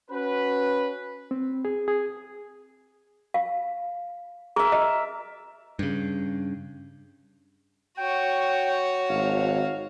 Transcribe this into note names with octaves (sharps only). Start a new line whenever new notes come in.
C#4 F#4 B4
C4
G#4
G#4
F5
G#4 A#4 E5
D#5
G2 C#3
F#4 C#5 G5
G#1 F5